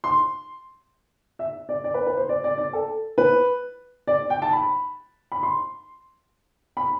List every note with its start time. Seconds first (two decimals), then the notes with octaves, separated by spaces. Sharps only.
0.04 C6
1.39 E5
1.69 D5
1.84 D5
1.94 B4
2.07 B4
2.17 C5
2.29 D5
2.44 D5
2.58 D5
2.73 A4
3.18 B4
4.07 D5
4.30 G5
4.42 A5
4.53 B5
5.32 B5
5.43 C6
6.77 B5